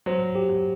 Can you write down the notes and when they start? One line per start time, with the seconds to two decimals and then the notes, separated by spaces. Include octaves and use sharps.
0.06 F#3 C5
0.35 G4
0.49 F#3